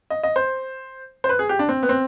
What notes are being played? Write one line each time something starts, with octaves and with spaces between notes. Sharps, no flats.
D#5
D#5
C5
C5
B4
G#4
G4
D4
C4
B3
C4